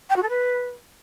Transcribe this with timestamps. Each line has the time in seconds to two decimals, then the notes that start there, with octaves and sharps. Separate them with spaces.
0.09 G5
0.16 F#4
0.22 A4
0.29 B4